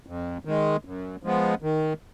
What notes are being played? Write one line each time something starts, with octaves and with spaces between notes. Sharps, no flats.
F2
D#3 G#3
F#2
F3 G#3 B3
D#3